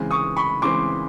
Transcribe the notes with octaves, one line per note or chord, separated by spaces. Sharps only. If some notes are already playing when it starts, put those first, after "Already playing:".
Already playing: C#3 E3 G#3 C4
C#6 D#6
B5 C#6
C#3 E3 G#3 C4 C6 D6